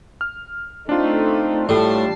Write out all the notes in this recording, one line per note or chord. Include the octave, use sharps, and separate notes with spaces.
F6
A3 C4 D4 D#4 F4
A2 G3 A5 C7